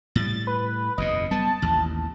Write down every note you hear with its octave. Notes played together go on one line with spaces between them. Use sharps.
A2 G3 A6
B4
F#1 E2 B2 D#5
G3 B3 A5
A1 D#2